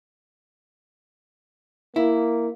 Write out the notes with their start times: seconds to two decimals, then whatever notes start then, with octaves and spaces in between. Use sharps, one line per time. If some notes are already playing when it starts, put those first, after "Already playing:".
1.96 A#3 E4